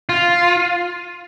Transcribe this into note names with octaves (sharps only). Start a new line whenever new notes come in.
F4